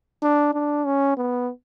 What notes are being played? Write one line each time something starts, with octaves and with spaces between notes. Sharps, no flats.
D4
D4
C#4
B3